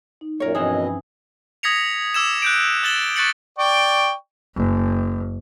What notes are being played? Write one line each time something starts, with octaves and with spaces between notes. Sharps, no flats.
D#4
F#2 A#2 A#4 C#5
G2 B2 E3 F3 C4 C#4 G#4 D#5
B4 B5
D#6 G#6 A#6 B6 C#7 F7
D6 E6 G#6 E7
F#6 G6 D7
E6 F#6 A6 E7 F#7 G7
C#6 F#6 A6 B6 C#7 F#7
D5 G5 C#6
F#1